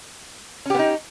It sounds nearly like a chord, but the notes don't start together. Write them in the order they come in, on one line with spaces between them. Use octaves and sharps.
C#4 G4 B3 D#4